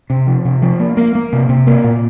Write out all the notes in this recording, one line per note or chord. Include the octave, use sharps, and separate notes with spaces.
C3
F3
C3
F3
A#3
A#3
A#3
C3
C3
A#3
A#2